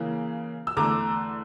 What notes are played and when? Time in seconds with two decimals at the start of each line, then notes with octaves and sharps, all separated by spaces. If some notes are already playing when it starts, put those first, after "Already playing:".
Already playing: C#3 E3 A#3
0.67 E6
0.76 E2 D3 A3 A#5 D6